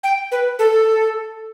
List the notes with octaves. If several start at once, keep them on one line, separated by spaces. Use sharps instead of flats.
G5
B4
A4